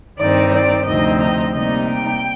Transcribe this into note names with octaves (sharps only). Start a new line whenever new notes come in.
G2 D#3 G3 C4 D#4 D5
D5
D2 C3 F3 C4 D#4 D#5
D#5
C3 G3 A#3 D#4 D#5
G5